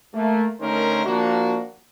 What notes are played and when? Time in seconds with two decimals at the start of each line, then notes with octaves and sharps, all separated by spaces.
0.14 A3 A#3
0.60 D3 D#3 A3 C#4 A#4 C5
1.05 F3 A#3 D4 F#4